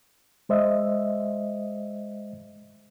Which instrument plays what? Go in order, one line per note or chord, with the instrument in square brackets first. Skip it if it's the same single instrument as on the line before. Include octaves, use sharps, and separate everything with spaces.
[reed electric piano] G#3 C5 D#5 E5